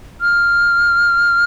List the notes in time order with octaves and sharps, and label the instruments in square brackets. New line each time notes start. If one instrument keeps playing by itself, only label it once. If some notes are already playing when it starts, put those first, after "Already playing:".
[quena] F6